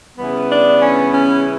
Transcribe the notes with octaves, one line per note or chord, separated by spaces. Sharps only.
C#3 E3 G3 B3
D4
C#4
C#4